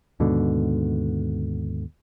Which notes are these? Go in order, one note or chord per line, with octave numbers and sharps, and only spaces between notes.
D#2 G#2 B2 D3